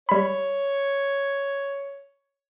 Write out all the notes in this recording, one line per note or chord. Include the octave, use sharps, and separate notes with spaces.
G3 C#5 B5